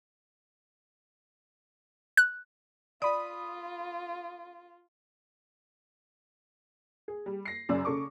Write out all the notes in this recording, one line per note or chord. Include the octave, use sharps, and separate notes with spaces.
F#6
F4 D5 B5 D#6
G#4
G3
A#6 C7
F#1 F#2 C#4 D5 E6
C#3 A4 C#6 D6